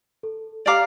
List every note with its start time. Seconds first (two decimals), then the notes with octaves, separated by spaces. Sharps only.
0.23 A4
0.66 G4 D5 F5 A#5 D6